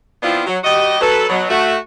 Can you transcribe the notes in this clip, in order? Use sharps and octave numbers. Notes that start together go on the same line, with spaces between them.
F3 B3 C4 D4 E4 F4
F#3
G3 F#4 G4 D#5
F#3 A4 B4
B2 F#3
A3 F#4